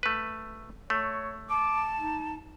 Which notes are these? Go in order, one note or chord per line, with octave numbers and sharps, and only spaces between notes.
A3 B4
A3 C#5
A5 D6
D#4